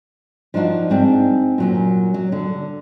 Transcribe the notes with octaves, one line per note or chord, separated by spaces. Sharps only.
F3 D4 D#4 F4 F#4
G#2 C4 D4
A#2 F#3 C#4
F#3
D3